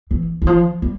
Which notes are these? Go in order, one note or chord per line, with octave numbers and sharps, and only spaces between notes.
E3
E3
F3
G3